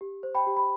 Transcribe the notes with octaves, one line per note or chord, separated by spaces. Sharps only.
G4
C5
G5 B5
G4
B5